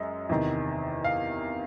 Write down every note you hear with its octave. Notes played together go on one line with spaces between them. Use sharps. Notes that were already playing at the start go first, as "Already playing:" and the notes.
Already playing: F#2 G#3 D#5
E2 C3 D#3
F5